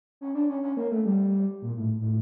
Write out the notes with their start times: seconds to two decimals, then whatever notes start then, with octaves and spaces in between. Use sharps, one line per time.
0.21 C#4
0.35 D4
0.49 C#4
0.63 C#4
0.77 A#3
0.91 A3
1.06 G3
1.62 A#2
1.77 A2
2.01 A2